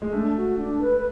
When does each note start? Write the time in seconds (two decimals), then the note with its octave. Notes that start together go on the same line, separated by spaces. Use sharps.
0.02 G#3
0.12 A3 D4
0.35 F#4
0.57 D4
0.80 B4